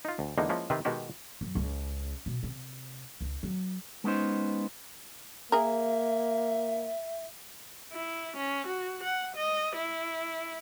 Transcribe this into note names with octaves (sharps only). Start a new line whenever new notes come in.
D#4 F4
D2
E2 D3 E3 G#3 A#3 D#4
F3 G#3 A#3 C#4 E4
C3 D#3 C4 B4
B2 D#3 G#3 F#4 G4
F#2
C#2
B2
C3
C#2
F#3
G#3 B3 C#4 D#4 C5
A#3 G#4 A#4 E5
E4
C#4
F#4
F#5
D#5
E4